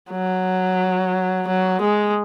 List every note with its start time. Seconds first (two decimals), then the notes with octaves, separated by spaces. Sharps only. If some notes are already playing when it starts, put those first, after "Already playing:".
0.11 F#3
1.47 F#3
1.81 G#3